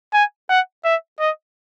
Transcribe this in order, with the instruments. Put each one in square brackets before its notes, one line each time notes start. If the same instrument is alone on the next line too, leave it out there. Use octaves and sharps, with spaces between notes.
[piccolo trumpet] G#5
F#5
E5
D#5